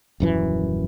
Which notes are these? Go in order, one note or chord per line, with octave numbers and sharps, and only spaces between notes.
D#1 F#2 E3